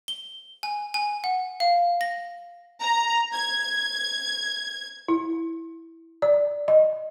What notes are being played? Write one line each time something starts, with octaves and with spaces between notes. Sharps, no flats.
G7
G#5
G#5
F#5
F5
A#6
A#5
G#6
E4
D5
D#5